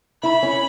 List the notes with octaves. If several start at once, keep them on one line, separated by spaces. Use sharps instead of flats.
E4 B5
C#4